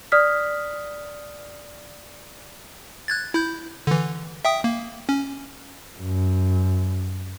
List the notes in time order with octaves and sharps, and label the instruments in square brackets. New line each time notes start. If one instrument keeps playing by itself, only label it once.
[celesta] D5 D#6 F6 B6
[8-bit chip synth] F#6 G#6 A6
E4 G6
D3 E3
E5 G5 D#6
A#3
C#4
[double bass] F#2